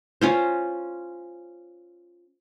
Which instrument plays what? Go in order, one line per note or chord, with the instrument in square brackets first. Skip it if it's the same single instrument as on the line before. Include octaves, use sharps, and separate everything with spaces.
[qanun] C#4 F4 C5